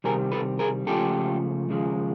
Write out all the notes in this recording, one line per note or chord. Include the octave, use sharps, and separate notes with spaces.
C2 C3 D#3 G3 C4 G#4 A#4
A4 B4
G#4 A#4
C#2 C#3 F3 A3 G4 A4
D#2 C#3 F3 G#3